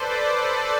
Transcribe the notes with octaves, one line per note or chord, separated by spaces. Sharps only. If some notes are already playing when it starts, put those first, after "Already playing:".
Already playing: A4 B4 C5 D5
A4 C5